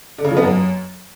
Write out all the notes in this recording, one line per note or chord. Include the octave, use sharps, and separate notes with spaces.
D3
C#3
F3
B3
F#2